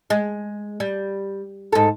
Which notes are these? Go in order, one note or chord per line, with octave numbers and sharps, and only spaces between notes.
G#3
G3
G#2 A4